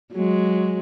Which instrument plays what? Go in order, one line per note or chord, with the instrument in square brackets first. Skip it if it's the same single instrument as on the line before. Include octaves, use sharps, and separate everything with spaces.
[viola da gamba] F#3 G#3